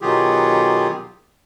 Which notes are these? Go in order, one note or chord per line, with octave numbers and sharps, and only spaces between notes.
B2 D#3 F#3 F4 G4 G#4